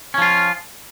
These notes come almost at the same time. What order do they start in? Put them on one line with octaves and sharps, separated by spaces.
C#4 F3 F4